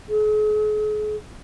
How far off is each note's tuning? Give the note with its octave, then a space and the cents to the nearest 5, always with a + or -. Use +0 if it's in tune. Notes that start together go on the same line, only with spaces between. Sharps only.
G#4 +40